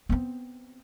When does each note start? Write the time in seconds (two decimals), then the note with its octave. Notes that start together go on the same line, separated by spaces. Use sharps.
0.09 B3 C4